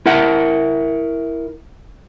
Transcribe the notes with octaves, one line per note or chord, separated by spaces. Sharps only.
E4 A#4 E5 F#5